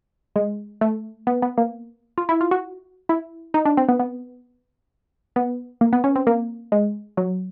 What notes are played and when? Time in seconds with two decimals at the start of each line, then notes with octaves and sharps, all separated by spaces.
0.36 G#3
0.81 A3
1.27 B3
1.42 B3
1.58 A#3
2.18 F4
2.29 E4
2.41 F4
2.51 F#4
3.09 E4
3.54 D#4
3.65 D4
3.77 C4
3.89 B3
4.00 B3
5.36 B3
5.81 A#3
5.93 B3
6.04 C#4
6.16 C4
6.27 A#3
6.72 G#3
7.17 F#3